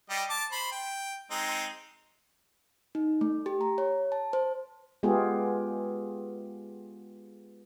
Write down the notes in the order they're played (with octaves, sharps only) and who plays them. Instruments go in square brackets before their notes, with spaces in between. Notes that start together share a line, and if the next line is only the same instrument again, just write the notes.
[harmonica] G3 G4 D#5
A5 D6
C5 B5
G5
G#3 C4 D#4
[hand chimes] D#4
A3
G4
A#5
C#5
A5
C5
[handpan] G#3 B3 F4 G4 G#4